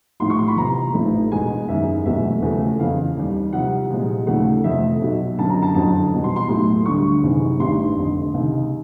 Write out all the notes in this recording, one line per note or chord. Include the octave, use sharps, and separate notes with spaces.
B1 A2 F3 C6
C#6
C6
B5
E2 C3 F3 A#5
A1 G#2 F3 A3
E1 E2 B2 G#3 G#5
F#1 F#2 D#3 G#3 E5
E1 E2 B2 F#3 A3 E5
E2 C#3 F3 A3
F2 C#3 E3 F5
D#2 D#3 G3
C2 C3 F3 F#5
C2 A#2 F3 G#3
D#2 C#3 F3 A3 F#5
F1 F2 C3 F3 A3 E5
B1 B2 F#3
F#1 F#2 D3 A5
A#5
A5
F#1 F2 D3 F#3 A5
E2 B2 G3
C6
C6
B1 A2 F#3 A3 C6
D2 D3 G3 C#6
F#1 E2 C3 D#3 G#3
A1 G2 D#3 G3 C6
F1 F2 D3
C#2 C3 D#3